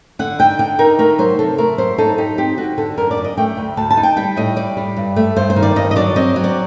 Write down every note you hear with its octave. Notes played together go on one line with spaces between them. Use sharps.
D3 F#5
D#4 G5
D3 G5
D#4 A#4
A3 A#4
F#3 C5
C3 A4
A3 A#4
F#3 C5
D#4 A4
D#4 G4
C4 G4
D3 F#4
D3 A4
F#2 A#4
D5
F#2
D#5
A3 G5
D2
D2 A5
A5
D#4
G5
G3 G5
A2 D#5
G3 D5
G3
G2
A3
G2 C5
C5
D#3
D5
G2 D#5
D#5
F#3 D5
C4 D#5
F#3
D5